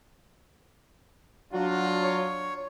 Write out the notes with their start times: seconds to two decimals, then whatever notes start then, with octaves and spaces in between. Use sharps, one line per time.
1.53 F#3 D4 F4 F#4
2.03 C#5